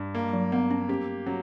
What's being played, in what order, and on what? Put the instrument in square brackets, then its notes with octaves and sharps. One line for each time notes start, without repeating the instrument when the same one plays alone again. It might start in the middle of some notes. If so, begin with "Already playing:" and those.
Already playing: [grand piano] G2
A#3
[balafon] G3
F#3
[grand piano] A#3 [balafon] B3
[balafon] C#4
[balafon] C#4 [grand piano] G4
[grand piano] F#3 [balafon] C#4